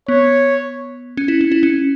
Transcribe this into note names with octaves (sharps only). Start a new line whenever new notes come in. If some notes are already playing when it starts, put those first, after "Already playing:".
B3 C#5
C#4
E4
C#4
E4
C#4